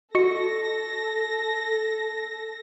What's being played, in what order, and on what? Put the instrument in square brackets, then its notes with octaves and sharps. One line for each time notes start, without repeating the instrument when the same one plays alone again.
[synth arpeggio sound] F#4 D#5 C#7 [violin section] A4 A#6